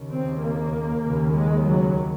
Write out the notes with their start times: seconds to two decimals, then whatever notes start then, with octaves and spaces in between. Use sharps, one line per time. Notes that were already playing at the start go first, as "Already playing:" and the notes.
Already playing: D#2 C#3
0.12 C4
0.43 A#3
1.04 D#2 C#3
1.33 G#3
1.64 F#3